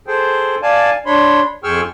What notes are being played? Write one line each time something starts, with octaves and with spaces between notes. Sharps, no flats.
G#4 A4 C5 G5
D5 F5 G#5 A5
D4 C#5 B5 C6
F2 G#4 G5 C#6 E6 F6